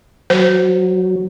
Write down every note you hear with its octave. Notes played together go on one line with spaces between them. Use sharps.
F#3 C5